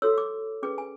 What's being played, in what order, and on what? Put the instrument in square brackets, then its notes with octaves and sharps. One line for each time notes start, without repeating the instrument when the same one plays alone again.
[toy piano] F#4 A4 C#5 E6
D6
C#4 G#4 B4 D6
G#5